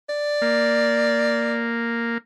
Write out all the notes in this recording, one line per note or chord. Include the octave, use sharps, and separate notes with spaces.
D5
A#3